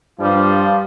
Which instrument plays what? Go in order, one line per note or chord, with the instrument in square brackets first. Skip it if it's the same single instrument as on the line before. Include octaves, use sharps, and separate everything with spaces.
[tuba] G2 [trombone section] F3 G3 F4